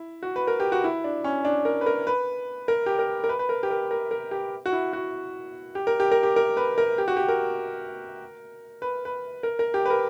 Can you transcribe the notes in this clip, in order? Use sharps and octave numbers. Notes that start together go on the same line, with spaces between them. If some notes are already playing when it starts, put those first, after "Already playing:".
Already playing: E4
F#4
B4
A#4
G4
F#4
E4
D4
C#4
D4
A#4
B4
A#4
B4
A#4
G4
A#4
A#4
B4
B4
A#4
G4
A#4
A#4
A#4
G4
F#4
E4
F#4
G4
A#4
G4
A#4
G4
A#4
B4
A#4
G4
F#4
G4
A#4
B4
B4
A#4
A#4
G4
B4
A#4